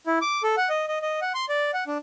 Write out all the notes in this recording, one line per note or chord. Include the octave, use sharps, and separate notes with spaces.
E4
D6
A4
F#5
D#5
D#5
D#5
F#5
C6
D5
F#5
D4